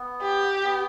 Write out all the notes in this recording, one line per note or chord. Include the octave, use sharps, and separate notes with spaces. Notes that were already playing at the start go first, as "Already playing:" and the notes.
Already playing: B3
G4
B3